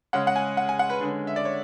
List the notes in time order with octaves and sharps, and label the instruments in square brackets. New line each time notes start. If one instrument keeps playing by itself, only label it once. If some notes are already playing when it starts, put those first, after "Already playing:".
[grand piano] C#3 G#3 C#4 F#5
F#5
G#5
F#5
G#5
F#5
B4
D3 G#3 C#4
E5
D5
C#5